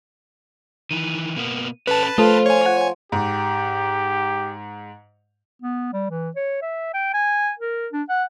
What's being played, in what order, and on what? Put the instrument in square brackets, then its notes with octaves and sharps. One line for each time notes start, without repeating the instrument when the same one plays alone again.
[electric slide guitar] D#3 E3 [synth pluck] D#7
[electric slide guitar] B2 A#3 B3
[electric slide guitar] C#4 A4 [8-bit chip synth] B4 A5
[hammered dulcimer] F3 [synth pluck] A3 A4 [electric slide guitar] F4
[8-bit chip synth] C#5 G#5
[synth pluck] F#5
[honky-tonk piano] G#2 [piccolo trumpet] G4
[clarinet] B3
G3
E3
C#5
E5
G5
G#5
A#4
D4
F#5